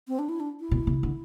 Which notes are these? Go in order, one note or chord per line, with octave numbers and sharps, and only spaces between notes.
C4
D4
E4
D4
E4
B2
C3
D3